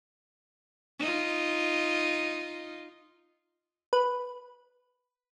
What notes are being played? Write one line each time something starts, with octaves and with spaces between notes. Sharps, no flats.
D#4 F4
B4